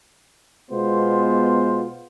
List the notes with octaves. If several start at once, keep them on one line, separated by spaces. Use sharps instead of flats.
B2 G#3 B3 F4 C5